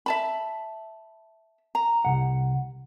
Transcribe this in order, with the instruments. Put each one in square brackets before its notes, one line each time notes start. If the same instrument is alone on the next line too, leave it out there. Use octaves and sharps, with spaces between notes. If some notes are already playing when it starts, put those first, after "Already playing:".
[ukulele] E5 A5 B5
A#5
[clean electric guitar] C2 G2 F#5